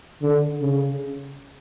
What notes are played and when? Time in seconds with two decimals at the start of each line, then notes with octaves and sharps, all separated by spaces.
0.22 D3
0.61 C#3